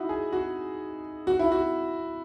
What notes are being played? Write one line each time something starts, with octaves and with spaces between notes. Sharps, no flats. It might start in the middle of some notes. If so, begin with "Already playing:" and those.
Already playing: D#4 E4 F#4
G#4
F#4
F#4
E4
F#4